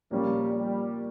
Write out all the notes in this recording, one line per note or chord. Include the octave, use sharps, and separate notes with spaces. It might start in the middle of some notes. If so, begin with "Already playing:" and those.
A#2 F3 G3 A#3 C#4 F4
G3